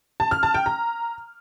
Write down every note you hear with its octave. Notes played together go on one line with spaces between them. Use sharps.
A5
F6
A5
G5
A#5